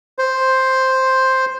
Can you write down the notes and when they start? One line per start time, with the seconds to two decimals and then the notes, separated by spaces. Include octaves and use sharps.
0.19 C5